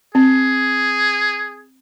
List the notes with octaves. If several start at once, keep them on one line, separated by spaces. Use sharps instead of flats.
C4 G#4